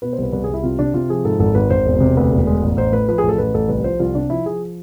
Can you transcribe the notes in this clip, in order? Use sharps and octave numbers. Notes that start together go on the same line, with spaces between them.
B2 B4
C5
C2 B4
C2 B4
C2 G#4
E4
C3 F4
C3 D4
C3 F4
F3 G#4
G#2 A4
G#1 A4
G#1 B4
G#1 C5
E1
C3
D2 B4
E1
G#3
A1
A1 C5
A2 B4
F3 B4
G#4
A1
A4
A1 B4
A1 A4
C2 B4
F3 C5
C2 F4
C3 D4
F3 E4
F3 G#4